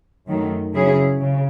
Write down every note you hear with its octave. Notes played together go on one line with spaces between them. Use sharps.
F#2 D#3 F#3 A3
C#3 F#3 C#4 E4 G#4
C#3